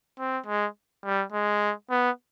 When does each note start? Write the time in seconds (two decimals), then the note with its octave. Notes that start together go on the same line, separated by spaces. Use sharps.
0.19 C4
0.46 G#3
1.04 G3
1.33 G#3
1.90 B3